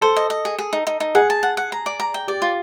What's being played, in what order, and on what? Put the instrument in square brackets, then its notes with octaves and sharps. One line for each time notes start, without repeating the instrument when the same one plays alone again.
[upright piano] A4 [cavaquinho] C5
[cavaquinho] D#5
D#5
G#4
G#4
D#4
D#4
D#4
[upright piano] G#4 [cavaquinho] F#5
[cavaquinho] A5
F#5
F#5
A#5
D5
A#5
G5
[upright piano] G4 [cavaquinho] D5
[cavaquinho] F4